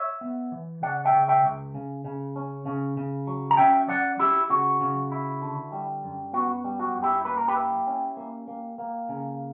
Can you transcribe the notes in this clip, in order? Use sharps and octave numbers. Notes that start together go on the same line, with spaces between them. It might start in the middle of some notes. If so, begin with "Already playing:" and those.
Already playing: C#5 E5
B3
E3
C#3 D5 F#5
E5 G5
C#3
E5 G5
C#2
C#3
C#3
C#4
C#3
C#3
F#3
A#5
C#4 E5 G5
F#3 D5 F#5
F#3 E4 G4
C#3 F#4
C#3
E4
D3
G3
F#2
B3 F#4
G3
F#4
F#2
E4 G4
A#3 B4
A#4
G4 B4
E4
C#4
A#3
A#3
A#3
C#3